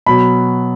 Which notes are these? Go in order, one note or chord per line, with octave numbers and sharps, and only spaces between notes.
B2 F#3 B5